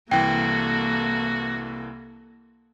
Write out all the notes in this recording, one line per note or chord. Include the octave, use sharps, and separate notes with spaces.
C2 E3 A#3 F#4 A4 G5